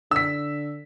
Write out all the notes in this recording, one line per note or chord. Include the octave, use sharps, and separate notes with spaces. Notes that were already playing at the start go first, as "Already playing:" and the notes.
D3 E6 B6